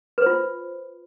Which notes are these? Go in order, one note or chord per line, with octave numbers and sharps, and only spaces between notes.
F4 B4 C5